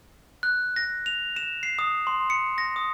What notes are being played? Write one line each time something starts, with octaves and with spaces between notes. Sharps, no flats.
F#6
A#6
F7
E7
C7
D#6
C6
C#7
A#6
D#6